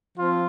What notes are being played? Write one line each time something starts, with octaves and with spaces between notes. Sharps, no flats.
F3 C4 F4